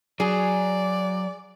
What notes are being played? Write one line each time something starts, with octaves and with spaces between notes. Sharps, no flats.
F#3 G#4 D5